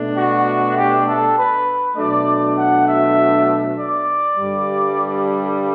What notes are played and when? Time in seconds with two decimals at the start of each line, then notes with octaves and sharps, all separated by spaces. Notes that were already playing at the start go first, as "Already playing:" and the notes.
Already playing: B2 A3 D4
0.16 F#4
0.75 G4
1.06 A4
1.36 B4
1.96 B2 F#3 A3 D4 D5
2.56 F#5
2.87 E5
3.77 D5
4.37 G2 D3 G3